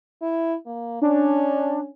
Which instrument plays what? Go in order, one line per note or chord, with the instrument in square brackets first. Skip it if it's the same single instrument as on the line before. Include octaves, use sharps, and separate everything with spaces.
[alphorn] E4
A#3
[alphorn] C#4 [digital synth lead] D4